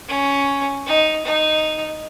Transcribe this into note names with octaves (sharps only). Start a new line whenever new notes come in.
C#4
D#4
D#4